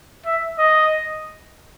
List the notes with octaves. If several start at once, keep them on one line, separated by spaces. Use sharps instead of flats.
E5
D#5